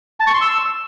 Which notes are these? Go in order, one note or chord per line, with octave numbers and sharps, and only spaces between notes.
A5
C#6
C6
E6